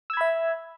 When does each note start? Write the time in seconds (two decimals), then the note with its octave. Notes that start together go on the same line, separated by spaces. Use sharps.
0.10 E6
0.13 G#6
0.17 B5
0.21 E5